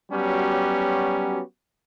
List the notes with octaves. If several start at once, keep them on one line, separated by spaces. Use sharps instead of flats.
F#3 G3 B3 C#4 F#4 G4